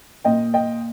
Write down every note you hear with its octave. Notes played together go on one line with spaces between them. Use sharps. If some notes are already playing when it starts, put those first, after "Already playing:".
A#2 D#5 G5
D#5 G5